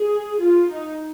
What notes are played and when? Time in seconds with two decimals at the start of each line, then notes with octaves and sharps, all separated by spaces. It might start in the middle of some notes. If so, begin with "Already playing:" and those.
Already playing: G#4
0.40 F4
0.70 D#4